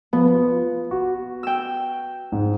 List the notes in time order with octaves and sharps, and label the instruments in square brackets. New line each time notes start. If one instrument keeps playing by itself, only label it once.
[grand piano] F3 B4 [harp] B3
[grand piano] F4
F#4
[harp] G5 E6
[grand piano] G#2